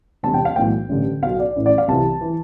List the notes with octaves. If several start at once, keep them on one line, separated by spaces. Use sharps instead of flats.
E1 E2 C3 A5
G5
F5
B1 A2 E3 G5
A1 G2 D3
B1 B2 F5
D5
A1 A2 E3
D5
F5
C2 C3 E3 A5
E3